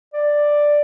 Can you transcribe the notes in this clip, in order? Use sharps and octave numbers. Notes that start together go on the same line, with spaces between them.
D5